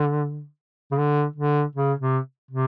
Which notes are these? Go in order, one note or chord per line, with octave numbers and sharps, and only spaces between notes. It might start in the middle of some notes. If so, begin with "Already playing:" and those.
Already playing: D3
C#3
D3
D3
C#3
C3
C3